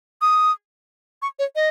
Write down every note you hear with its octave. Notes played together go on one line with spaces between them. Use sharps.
D#6
C#6
C#5
D#5